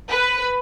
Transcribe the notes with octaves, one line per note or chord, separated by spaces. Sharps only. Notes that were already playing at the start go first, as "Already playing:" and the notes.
B4